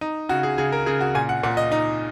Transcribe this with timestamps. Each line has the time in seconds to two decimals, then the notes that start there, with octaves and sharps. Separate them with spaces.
0.01 D#4
0.29 C#3 F#4
0.43 G#4
0.58 C#3 G#4
0.72 A#4
0.86 C#3 G#4
1.01 F#4
1.15 A#2 G#5
1.29 F#5
1.43 A#2 F#5
1.57 D#5
1.72 D#4